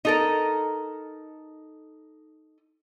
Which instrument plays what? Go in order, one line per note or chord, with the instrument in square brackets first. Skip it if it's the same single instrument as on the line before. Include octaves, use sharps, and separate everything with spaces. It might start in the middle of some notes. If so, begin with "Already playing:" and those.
[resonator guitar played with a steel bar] D#4 A4 A#4